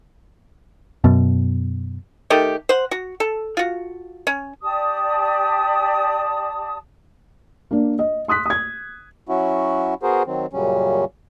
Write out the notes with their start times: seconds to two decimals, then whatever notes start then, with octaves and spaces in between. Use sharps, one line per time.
1.04 F#2 B2
2.30 D#3 A3 G4
2.69 C5 F#5
2.91 F#4
3.20 A4
3.57 F4 F#4
4.27 C#4
4.62 G4 D5 A5 D#6
7.71 A#3 D4
7.99 D#5
8.28 C6 D#6 F#6 B6
8.46 D#6 G#6
9.29 F#3 C#4 E4 F#4
10.03 B3 F#4 G#4 A#4 C5
10.26 D#3 F#3 C4
10.53 F#2 A#2 C#3 F#3 G3 C#4